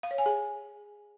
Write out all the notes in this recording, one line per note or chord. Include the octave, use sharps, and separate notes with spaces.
F5
C#5
G#5
G#4